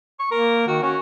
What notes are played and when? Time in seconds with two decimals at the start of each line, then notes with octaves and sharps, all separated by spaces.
0.19 C#6
0.31 A#3 A#4
0.67 D#3 F#4
0.82 C#4 F#4